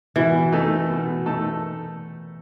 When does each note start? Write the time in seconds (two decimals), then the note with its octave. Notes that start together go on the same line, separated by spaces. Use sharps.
0.16 B2 E3
0.52 A3 D#4 A4
0.90 B2
1.26 A3 D#4 A4